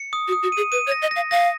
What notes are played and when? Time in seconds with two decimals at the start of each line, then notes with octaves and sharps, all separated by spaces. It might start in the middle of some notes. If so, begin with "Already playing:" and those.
Already playing: C#7
0.13 D#6
0.28 F#4
0.32 D#6
0.43 F#4
0.52 G#4 D#7
0.72 B4 D#7
0.87 C#5
0.92 A#6
1.02 D#5
1.11 F5 A#6
1.31 F5 A#6